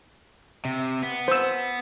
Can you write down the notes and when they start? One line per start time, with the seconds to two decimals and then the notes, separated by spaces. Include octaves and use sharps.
0.65 C3
1.03 B3
1.28 C5 E6